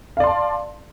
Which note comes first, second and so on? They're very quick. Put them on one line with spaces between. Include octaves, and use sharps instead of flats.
F5 D5 C6 A5